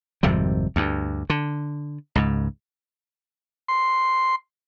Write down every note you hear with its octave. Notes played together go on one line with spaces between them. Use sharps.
G#1 F2 C3 G3
D2 G2
D3
C#2 G#2
C6